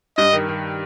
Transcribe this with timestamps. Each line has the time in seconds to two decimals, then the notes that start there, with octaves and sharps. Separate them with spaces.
0.17 G2 D#5
0.33 D#3
0.48 D#3